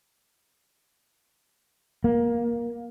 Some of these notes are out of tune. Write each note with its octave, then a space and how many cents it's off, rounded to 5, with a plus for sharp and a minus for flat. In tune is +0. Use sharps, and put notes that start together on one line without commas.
A#3 +15